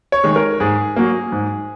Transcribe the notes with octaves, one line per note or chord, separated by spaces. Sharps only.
C#5
D#3 G#3
A#4
G#2 G#4
F#3 A#3
G#2